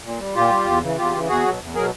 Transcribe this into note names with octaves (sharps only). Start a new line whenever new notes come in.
A#2
G3
A#2 F4 G4
G3
E2
C#3 E3
E2 F4 G4
C#3 E3
E2 F#4 G#4
B2 F#3
E2
B2 F#3 G#4 A#4